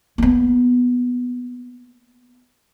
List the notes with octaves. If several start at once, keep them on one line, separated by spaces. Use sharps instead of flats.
A#3 B3